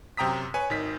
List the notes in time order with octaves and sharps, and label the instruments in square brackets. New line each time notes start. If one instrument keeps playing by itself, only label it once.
[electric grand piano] F#2 C3 G5 A#5 D#6 B6
B4 C#5 G#5
G#1 D#3 B6